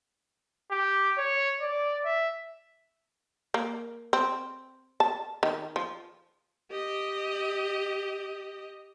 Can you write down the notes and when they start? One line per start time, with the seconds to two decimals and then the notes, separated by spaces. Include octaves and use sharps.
0.71 G4
1.18 C#5
1.61 D5
2.05 E5
3.54 A#3
4.13 C4
5.00 A5
5.43 D#3
5.76 F3
6.71 G4 D#5